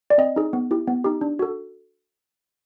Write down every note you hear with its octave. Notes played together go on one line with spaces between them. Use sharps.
D5
C4 D#5
D#4 G#4
B3
E4 G4
B3
D#4 G4
D4
F#4 A4